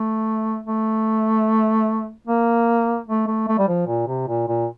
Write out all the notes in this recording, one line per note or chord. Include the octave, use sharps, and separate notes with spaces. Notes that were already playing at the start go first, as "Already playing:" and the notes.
Already playing: A3
A3
A#3
A3
A3
A3
G3
F3
A#2
C3
A#2
A#2